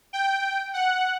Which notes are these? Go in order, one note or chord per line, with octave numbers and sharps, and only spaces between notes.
G5
F#5